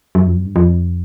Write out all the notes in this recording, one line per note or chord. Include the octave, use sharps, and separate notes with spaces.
F#2
F2
F#2
G2
F2